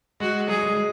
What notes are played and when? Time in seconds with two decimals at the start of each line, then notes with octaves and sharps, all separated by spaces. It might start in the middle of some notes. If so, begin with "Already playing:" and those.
0.20 G#3 F#4
0.48 F#3 G#4
0.62 G#3
0.76 G#3